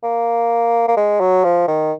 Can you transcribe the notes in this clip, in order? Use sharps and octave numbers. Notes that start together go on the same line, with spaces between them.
A#3
A#3
G#3
F#3
F3
D#3